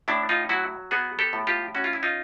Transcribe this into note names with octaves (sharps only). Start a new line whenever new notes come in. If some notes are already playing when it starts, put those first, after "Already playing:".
A2 D4 E4
D#4 F4
F#3 E4 F#4
B3 F#4 G#4
G4 A4
A2
F4 G4
C#4 F#4
F4
E4
D#4 F4